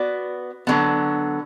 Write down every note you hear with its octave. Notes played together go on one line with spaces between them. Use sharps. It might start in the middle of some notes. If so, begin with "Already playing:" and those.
Already playing: B3 F#4 B4 D5
D3 F#3 B3